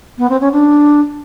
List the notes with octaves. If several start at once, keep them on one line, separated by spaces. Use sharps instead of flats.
B3
C4
C#4
D4